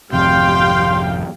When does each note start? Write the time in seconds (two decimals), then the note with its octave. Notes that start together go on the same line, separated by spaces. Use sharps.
0.12 G#1 F2 C3 G4 F5 G5 C6